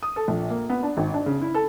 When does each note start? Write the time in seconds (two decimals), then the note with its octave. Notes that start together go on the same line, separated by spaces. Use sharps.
0.03 D#6
0.16 A4
0.28 A#1
0.50 A#3
0.70 B3
0.83 D4
0.97 G#1
1.14 D4
1.26 C#3
1.42 E4
1.54 A4